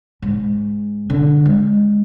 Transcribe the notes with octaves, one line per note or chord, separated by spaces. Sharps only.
G#2
D3
G#3